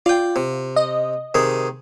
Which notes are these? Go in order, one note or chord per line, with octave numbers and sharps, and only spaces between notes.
F4 D5 G5
C3
D#5
C3 D#3 G#4